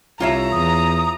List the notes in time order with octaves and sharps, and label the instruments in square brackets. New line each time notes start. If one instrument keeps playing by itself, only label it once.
[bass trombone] C2 [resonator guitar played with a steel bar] F4 C#5 E5 [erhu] A#5
[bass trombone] E2 [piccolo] D#6